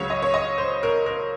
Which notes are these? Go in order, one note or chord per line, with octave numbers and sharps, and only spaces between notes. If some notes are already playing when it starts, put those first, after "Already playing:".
Already playing: C#2 C#3 F#3 C#5
D#5
C#5
D#5
C5
A#4
A#4